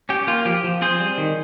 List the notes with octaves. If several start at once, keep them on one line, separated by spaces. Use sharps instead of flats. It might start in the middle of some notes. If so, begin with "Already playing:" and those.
C#4 G4
A#3 F4
F3 G4
F3
C4 G#4 C5
G3
D#3